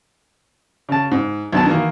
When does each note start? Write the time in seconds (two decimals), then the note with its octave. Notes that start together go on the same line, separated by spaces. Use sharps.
0.89 C#3 A5
1.12 G#2
1.53 B1 D#3 B3 A5
1.66 D#3 E3 A#3